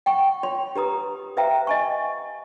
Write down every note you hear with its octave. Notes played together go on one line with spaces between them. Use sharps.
F#5 G5 C#6
F4 C#5 C6
G4 B4 A#5 D#6
B4 C5 E5 F5 G5 A#5
D#5 G#5 C#6